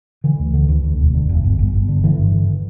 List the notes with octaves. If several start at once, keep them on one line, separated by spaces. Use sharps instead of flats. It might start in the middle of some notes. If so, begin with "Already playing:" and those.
D3 E3
D2
D3
D2
D2
E1
D3
E1
G1
G1
G1
D3
D3 E3
G2
D3
D3